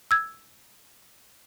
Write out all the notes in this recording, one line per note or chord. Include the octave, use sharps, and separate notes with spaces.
E6 G#6